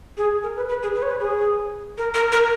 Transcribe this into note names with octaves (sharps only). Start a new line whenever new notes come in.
G#4
A#4
B4
B4
G#4
B4
C#5
B4
G#4
A#4
A#4
A#4